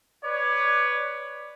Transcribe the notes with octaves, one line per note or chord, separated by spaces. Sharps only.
B4 C#5 D5